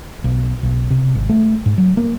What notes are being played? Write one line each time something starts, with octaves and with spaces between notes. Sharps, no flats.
B1
B1
C3
G#1
A3
G#2
F#3
A#3